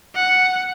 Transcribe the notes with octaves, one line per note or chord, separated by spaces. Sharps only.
F#5